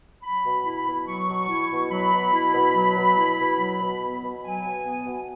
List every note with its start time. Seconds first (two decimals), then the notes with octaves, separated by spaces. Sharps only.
0.23 F#3 B5
0.45 B2
0.65 E4
0.87 B2
1.07 F#3 C#6
1.28 B2
1.50 E4
1.70 B2
1.91 F#3 B5
2.12 B2
2.33 E4
2.54 B2
2.75 F#3
2.96 B2
3.17 E4
3.38 B2
3.59 F#3
3.80 B2
4.01 B3
4.22 B2
4.43 F#3 G#5
4.64 B2
4.85 B3
5.06 B2